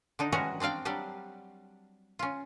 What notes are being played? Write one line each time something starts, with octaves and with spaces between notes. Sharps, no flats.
D3 D4 D#4
E3 G3 G#3 C#4 F#4 A#5
C4 D4 D5 F5 G5
F#3 G3 D4 G4
C#4 F4